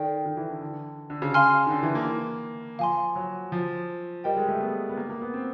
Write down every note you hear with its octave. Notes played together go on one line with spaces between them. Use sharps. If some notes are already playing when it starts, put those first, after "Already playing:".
Already playing: D#3 A4 D5 G5
D#3
E3
D3
D3
D3
C#3
F5 G#5 C6 F6
D#3
D3
E3
A#3
F3 F5 G#5 C6
F#3
F3
G3 A#4 D#5 G5
G#3
A3
B3
B3
A#3
A#3
B3
C4